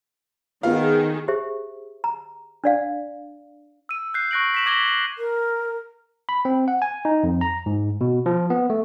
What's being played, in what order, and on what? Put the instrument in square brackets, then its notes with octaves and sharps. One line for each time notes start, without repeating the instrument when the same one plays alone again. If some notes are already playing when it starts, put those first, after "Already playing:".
[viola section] D#3 G#4 [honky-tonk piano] B3 F4 F5
[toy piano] G4 G#4 C5 E5
A#5
D4 D5 F5
[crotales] E6 D#7
F#6 G6 C7
C#6 F#6 A#6 D7 F#7
B6 E7 F#7
D6 G#6 A#6 B6 G7
F#7
[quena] A#4
[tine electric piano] B5
C4
F#5
G#5
D#4
F2
A#5
G#2
B2
F3
B3
A3